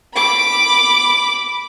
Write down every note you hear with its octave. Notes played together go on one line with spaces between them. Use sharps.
B5 D6